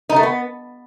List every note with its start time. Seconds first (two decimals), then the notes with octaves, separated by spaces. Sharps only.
0.09 D#4
0.16 A3
0.23 B3